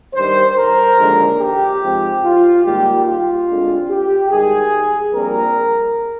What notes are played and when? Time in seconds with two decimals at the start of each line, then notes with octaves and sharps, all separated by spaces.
0.14 G2 D#3 G3 C5
0.56 A#4
0.97 D#2 D3 F3 G#3
1.40 G4
1.81 G#2 F3 C4
2.22 F4
2.64 G#2 D#3 G3 A#3 G4
3.06 F4
3.47 D2 D3 G#3 C4
3.89 G4
4.30 G#2 D#3 G3 G#4
5.13 A#1 A#2 G3 C4 A#4